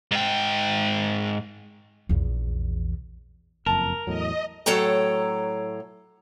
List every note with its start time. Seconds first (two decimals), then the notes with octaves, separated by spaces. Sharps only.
0.11 G#2 G5
2.09 A#1 E2
3.66 F#1 F2 A#4 A5 A#5
4.07 E2 A2 F#3 D#5
4.66 A2 F#3 A4 C#5 G5 A#5